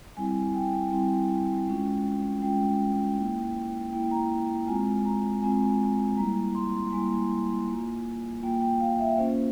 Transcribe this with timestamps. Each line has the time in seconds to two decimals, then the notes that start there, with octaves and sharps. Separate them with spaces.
0.17 G3 C4 E4 G#5
0.54 G5
0.92 G3 C4 E4
1.67 G#3 C#4 F4
2.42 G#3 C#4 F4 G5
3.18 A#3 E4
3.92 A#3 E4 G5
4.11 A#5
4.67 G#3 C4 F4 G#5
5.05 A#5
5.42 G#3 C4 F4 G#5
6.17 G3 A#3 E4 A#5
6.55 C6
6.92 G3 A#3 E4 G#5
7.67 A#3 F4
8.43 A#3 F4 G5
8.61 G5
8.80 F5
8.99 E5
9.18 A#3 C#4 F4 C5